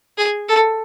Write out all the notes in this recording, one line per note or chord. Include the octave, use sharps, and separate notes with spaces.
G#4
A4